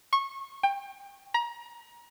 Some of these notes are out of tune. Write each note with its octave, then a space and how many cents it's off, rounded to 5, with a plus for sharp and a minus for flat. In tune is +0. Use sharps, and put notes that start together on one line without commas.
C#6 -20
G5 +25
A#5 +30